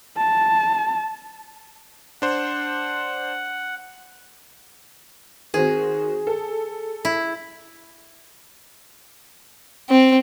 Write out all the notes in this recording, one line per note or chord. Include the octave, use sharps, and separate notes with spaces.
A5
D4 C5 F#5
D#3 C4 F#4 G#4
A4
E4
C4